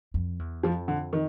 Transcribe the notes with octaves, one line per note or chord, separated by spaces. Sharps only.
F2
E2
F2 F3
D3
D#3